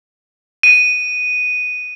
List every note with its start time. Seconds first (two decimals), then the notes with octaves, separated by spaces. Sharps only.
0.63 D#7